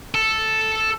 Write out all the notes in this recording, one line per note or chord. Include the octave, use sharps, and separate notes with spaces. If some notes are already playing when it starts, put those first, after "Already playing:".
A4